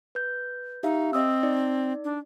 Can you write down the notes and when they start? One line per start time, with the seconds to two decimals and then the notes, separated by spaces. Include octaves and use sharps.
0.15 B4 G6
0.83 D#4 G4 E5 F5
1.13 C4 D#5 D#6 E6
1.43 D#4 D5
2.04 D4